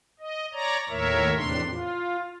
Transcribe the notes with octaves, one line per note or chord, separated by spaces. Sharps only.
D#5
C#5 D5 A#5
D#2 A2 A#4 C#5 E5
E2 A2 C3 D4 C6
F4